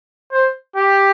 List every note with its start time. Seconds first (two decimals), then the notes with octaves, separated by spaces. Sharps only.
0.32 C5
0.76 G4